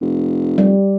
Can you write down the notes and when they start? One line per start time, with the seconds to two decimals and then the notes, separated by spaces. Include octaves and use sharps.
0.01 F1
0.58 G3